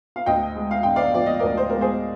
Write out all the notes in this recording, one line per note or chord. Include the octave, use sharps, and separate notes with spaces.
F5
D2 D#5 G5
G#3
F5
D3 G5
D5 F5
F3 D5
D#5
A#4 D5
D2
C5
G#3 A#4
G#4 C5